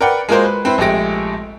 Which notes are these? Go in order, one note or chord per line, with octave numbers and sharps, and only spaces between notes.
A#4 B4 D5 F#5 G5
G#3 A#3 F4 F#4 A#4 C5
B4
C4 E4 B4 C5
A#1 G#3 A3 G4 A#6 D7